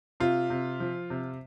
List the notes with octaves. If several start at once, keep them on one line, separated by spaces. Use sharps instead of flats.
C3 F4
C3
F3
C3